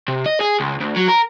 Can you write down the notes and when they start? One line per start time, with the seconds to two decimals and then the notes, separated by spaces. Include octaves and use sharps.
0.08 C3
0.26 D#5
0.40 G#4
0.60 C#2
0.80 D2
0.96 F#3
1.08 A#4